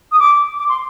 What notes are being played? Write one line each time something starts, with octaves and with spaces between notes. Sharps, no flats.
D#6
D6
D6
C6